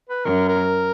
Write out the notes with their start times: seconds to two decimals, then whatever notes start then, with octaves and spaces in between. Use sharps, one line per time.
0.09 B4
0.25 F#2 A#4
0.49 A#4